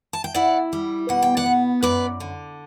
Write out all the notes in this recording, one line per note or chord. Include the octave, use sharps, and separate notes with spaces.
A5
G5
E4 D5 F#5
G3
B2 F#5
G5
D5 F#5
B3
F#2 B4 D5
D3